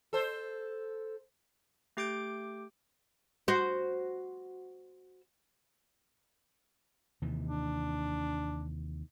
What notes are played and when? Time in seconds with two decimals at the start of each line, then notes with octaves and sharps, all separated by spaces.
0.13 A4 C5
1.97 A3 G4 D6 G6 D7
3.48 F#4 C5
7.22 D#2 C3 E3
7.45 D4